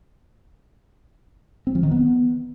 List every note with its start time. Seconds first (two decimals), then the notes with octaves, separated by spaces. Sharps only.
1.67 C4
1.75 F3
1.83 D#3
1.91 B3